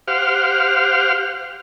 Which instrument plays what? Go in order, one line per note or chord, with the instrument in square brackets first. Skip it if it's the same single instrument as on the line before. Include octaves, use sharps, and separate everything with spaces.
[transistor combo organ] G4 C5 F5 F#5 F6